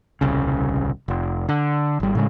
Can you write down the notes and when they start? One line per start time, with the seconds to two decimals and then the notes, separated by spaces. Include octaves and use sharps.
0.21 D#1 C2 C#3
1.08 F1
1.49 D3
2.00 G#1 G3
2.15 A2 C#3 G#3